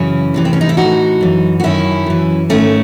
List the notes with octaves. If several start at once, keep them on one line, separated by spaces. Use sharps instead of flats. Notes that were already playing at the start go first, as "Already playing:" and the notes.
Already playing: F#2 C#3 E3 C#4 E4
E2 C3 E3
C4
C#4
D#4
E4
A2 E3 D#4 F#4
F#2 E3
F#4
F#2 D#3 C#4 E4
F#2 E3
G#2 D#3 A3 C#4